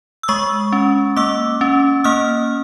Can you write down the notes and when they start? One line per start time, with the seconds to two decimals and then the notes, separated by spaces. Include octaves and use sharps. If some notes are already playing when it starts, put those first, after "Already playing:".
0.23 E6
0.28 G#3 C#6 D#6
0.73 C#4
1.16 A#3 D6 E6
1.61 C#4
2.04 A#3 D#6 F6